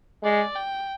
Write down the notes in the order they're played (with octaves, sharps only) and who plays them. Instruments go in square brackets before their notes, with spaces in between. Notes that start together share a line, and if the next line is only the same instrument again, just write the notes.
[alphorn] G#3 [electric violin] D5
[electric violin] G5